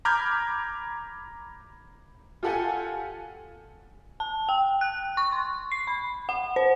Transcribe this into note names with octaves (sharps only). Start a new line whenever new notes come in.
A#5 B5 D6 F6 G6 G#6
F4 G4 A4 F#5 G#5
A5
G5
F#6
C#6
C6
C7
B5
F#5
C5